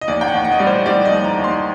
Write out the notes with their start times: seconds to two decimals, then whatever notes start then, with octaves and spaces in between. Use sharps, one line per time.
0.01 D#5
0.08 D#2 D5
0.21 G5
0.28 F#5
0.34 D#2
0.45 F#5
0.52 D#5
0.59 G3 D5
0.67 C5
0.86 G3 D5
1.05 D#5
1.11 D#2
1.24 A#5
1.37 D#2
1.44 C6